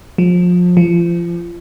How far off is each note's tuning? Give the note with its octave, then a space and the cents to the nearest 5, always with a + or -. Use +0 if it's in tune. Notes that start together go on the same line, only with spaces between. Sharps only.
F3 +30
F3 -30